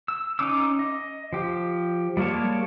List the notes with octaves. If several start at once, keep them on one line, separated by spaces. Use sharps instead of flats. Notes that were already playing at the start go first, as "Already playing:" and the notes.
E6
C#4 D#4 D6 E6
D#5
F3 G4
G3 G#3 A#3 C#5 A5